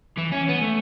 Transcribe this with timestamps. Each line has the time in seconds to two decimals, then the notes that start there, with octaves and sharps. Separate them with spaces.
0.18 E3
0.32 C#4
0.49 B3
0.62 A3